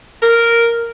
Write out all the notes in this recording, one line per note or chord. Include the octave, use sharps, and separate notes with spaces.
A#4